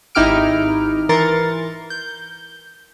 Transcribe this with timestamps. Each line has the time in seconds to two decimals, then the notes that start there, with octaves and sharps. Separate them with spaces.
0.15 G#1 D#4 E4 G4 F6 D7
1.09 E3 A#4 C6 A6 C#7
1.90 G6